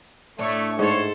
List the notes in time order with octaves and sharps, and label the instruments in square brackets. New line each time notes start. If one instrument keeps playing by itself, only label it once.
[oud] A2 D4 E4 [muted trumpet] A3 [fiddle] C#5 C#6
[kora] G#2 [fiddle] A4 C5 [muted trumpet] C#5